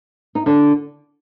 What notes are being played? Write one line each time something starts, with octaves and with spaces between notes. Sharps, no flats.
D#4
D3 D4